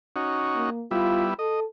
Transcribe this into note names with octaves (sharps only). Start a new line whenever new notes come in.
C#4 D#4 F#4
A#3
G3 B3 E4 F4
A4 D#5